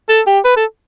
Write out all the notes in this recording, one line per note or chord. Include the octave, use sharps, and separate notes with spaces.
A4
G4
B4
A4